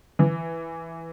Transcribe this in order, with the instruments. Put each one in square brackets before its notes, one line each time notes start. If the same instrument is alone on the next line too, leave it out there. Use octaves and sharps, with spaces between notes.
[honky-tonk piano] E3